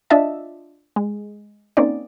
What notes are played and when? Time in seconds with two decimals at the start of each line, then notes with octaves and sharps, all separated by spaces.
0.10 D4 F4 D#5 E5 A5
0.96 G#3
1.77 A#3 C4 C#4 D#4 D5